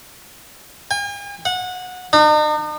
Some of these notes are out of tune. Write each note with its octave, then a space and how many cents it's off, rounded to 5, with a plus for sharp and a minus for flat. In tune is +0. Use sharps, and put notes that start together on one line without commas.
G#5 -45
F#5 -20
D#4 -45